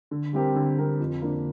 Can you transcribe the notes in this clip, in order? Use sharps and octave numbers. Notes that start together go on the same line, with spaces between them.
D3
G3 C4 G4 A#4
D3
G3 C4 G4 A#4
F2
D3 A#3 D4